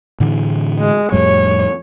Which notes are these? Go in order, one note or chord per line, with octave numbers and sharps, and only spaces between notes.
A2 D3 E3
G#3
F2 A2 G3 C#5